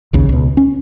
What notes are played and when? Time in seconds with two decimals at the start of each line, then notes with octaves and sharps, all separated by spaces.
0.13 A#1 D#2 C#3
0.29 C#2 B2
0.57 C#4